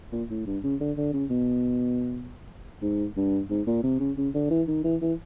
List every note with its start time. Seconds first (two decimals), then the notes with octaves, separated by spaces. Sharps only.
0.12 A#2
0.30 A2
0.46 G2
0.63 C#3
0.80 D3
0.97 D3
1.13 C#3
1.30 B2
2.82 G#2
3.16 G2
3.50 G#2
3.67 A#2
3.83 C3
4.00 C#3
4.17 C#3
4.34 D3
4.51 E3
4.68 D#3
4.84 E3
5.01 E3